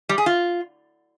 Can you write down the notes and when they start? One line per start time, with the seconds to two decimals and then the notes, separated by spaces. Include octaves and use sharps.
0.09 G3
0.18 G#4
0.26 F4